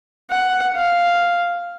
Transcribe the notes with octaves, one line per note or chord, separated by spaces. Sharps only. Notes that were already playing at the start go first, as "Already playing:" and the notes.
F#5
F5